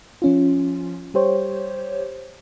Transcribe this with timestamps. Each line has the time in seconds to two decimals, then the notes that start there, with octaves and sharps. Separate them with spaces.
0.22 F3 C#4 F4
1.14 G3 G4 C5 C#5